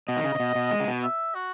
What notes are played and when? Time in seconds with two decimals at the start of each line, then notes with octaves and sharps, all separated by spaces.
0.08 B2 D#5
0.17 D#3
0.24 C#3
0.35 C#3
0.40 B2
0.55 B2
0.71 G#3
0.80 C#3
0.88 B2
1.03 E5
1.35 F#4